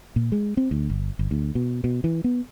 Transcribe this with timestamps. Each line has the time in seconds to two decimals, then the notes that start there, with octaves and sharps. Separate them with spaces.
0.16 A#2
0.32 G#3
0.57 C4
0.71 D2
0.90 G1
1.19 G1
1.31 D2
1.55 B2
1.84 B2
2.04 E3
2.24 B3